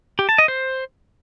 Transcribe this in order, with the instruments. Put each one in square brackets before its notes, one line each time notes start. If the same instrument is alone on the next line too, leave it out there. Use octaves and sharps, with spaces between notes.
[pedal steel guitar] G4
A5
D#5
C5